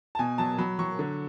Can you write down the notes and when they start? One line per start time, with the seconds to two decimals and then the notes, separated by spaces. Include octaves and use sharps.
0.15 A5
0.19 B2 G#5
0.38 F#3 A5
0.58 F#3 B5
0.79 F#3 C#6
0.99 D3